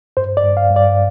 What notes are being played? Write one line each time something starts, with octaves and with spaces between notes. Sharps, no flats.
G2 C5
D5
G2
F5
G2
D5